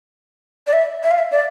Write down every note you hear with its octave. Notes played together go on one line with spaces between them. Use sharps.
D5
E5
E5
F5
E5
D5